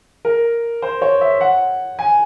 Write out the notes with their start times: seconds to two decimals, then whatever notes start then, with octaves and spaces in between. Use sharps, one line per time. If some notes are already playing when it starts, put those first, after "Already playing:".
0.25 A#4
0.82 C5
1.02 C#5
1.21 E5
1.41 F#5
1.99 G#5